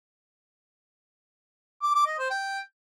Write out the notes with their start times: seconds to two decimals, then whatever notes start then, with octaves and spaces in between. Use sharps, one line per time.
1.83 D6
1.95 D6
2.07 D#5
2.19 C5
2.31 G5